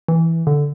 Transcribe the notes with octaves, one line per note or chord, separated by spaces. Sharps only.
E3
D3